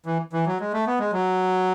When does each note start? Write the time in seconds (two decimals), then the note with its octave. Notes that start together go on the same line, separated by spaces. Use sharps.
0.06 E3
0.33 E3
0.46 F#3
0.60 G#3
0.73 A3
0.87 B3
0.99 G#3
1.13 F#3